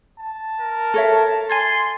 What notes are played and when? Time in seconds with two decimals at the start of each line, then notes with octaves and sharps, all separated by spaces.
0.18 A5
0.61 A#4
0.94 A4 C#5 E5
1.50 G#5 C6 G#6 A6